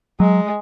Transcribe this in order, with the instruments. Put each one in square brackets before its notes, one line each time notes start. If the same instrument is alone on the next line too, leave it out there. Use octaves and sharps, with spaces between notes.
[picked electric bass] F#3 [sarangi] G#3